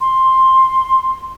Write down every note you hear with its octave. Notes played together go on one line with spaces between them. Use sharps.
C6